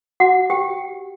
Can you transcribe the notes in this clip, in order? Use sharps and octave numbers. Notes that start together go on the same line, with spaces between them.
F#4 F#5
G4 G5